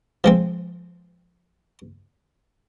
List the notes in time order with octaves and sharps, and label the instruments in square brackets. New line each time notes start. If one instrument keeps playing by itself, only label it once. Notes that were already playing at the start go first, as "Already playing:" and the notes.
[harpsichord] F3 G#3 C4